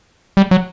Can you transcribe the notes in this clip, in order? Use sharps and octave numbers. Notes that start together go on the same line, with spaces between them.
G3
F#3